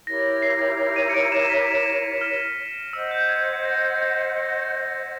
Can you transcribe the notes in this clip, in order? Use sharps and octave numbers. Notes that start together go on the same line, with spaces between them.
E4 G4 A#4 C#5 A#6
C7
D#7
C#7
D7
E7
B6
F6
C5 D#5 F#5 E6
G6
G#6
A#6
G#6
A#6